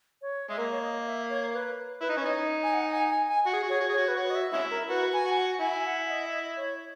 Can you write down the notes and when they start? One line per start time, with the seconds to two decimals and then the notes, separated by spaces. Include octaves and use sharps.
0.22 C#5
0.50 G#3 E5
0.58 A#3 D#5
0.72 C#5
0.82 D#5
1.06 E5
1.30 C#5
1.54 B4
2.01 E4 B4
2.09 D#4
2.17 C#4
2.21 D#5
2.24 D#4 C#5
2.63 G#5
2.74 F#5
2.92 G#5
3.10 G#5
3.28 G#5
3.45 F#4 F#5
3.53 G#4
3.63 F#4
3.69 G#4 C#5
3.80 F#4
3.89 G#4
3.93 F#4 C#5
4.08 B4
4.17 F#4 C#5
4.30 D#5
4.35 E5
4.53 G#3 C#4 E4 E5
4.71 A#4
4.89 F#4 B4
5.13 G#5
5.25 F#4
5.37 F#5
5.60 E4 G#5
5.85 F#5
6.09 D#5
6.33 D#5
6.57 C#5